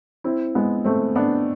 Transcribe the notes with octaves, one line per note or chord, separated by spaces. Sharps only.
C4 E4
G#3 B3
A3 C4
B3 D4